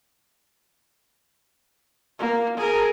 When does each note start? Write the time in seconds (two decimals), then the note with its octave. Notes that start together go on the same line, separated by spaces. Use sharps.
2.19 A#3
2.57 G#4 A#4